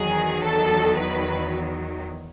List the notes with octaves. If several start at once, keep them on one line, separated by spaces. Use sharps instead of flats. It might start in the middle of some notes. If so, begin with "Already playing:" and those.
Already playing: E2 D#3 F#3 G#4
A4
B4